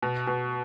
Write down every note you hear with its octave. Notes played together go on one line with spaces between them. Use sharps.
B2
B2